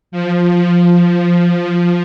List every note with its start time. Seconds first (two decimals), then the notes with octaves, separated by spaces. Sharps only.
0.12 F3
0.55 F3
0.97 F3